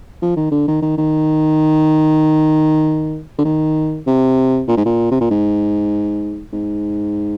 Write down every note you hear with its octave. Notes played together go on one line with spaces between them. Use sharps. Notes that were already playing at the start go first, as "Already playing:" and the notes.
F3
D#3
D3
D#3
D#3
D#3
D3
D#3
C3
A#2
G#2
A#2
C3
A#2
G#2
G#2